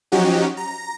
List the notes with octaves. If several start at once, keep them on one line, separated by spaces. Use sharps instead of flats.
F3 F#3 C#4 D#4 F#4 G4
A#5